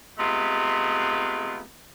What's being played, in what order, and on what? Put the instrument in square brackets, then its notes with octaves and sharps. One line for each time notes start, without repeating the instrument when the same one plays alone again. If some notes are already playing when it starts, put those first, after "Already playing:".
[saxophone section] C3 G#3 A3 B3 F4